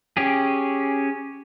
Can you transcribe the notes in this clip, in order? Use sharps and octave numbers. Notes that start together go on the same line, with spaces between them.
C#4 G4 G#4